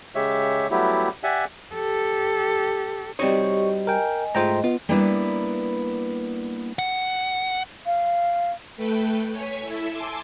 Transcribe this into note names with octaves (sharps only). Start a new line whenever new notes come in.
C#3 G#3 G4 C#5 E5
F#3 G3 A3 B3 E4 G4
G4 D5 E5 F#5 G#5
G4 A4
G3 C4 D#4 F#4 G4 C#5 D#5 C#6
A#4 D#5 G5 G#5
G#2 A3 F4 C5 D#5 G5 A#5
B3 F4
G3 A#3 B3 D4 E4 B4
F#5
F5
A3 A4 B4 G5
C#5 G#5 B6
E4 A4 E5
G#5 A5 C6 D6 E6